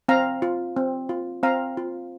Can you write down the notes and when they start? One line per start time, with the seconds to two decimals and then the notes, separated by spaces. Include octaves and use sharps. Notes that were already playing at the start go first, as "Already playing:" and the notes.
0.08 C4 F5 A#5
0.42 F4
0.77 C4
1.09 F4
1.43 C4 F5 A#5
1.77 F4